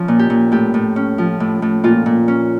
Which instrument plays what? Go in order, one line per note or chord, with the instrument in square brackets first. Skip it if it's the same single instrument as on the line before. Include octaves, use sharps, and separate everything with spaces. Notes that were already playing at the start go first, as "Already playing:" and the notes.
Already playing: [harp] F3 C#4
A#2
G4
A#2
A2 G4
A2
C#4
F3
A2
A2
A#2 F4
A#2
C#4